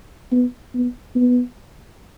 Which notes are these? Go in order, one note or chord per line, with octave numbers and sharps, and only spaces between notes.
B3
B3
B3